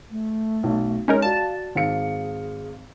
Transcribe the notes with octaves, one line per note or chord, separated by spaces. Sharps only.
A3
B1
G#3 C#4 D#4 A#4
F#4 D5 F5 A5
G#1 G#4 F5 C#7